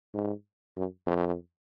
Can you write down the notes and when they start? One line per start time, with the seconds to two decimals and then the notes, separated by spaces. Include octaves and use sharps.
0.14 G#2
0.77 F#2
1.07 F2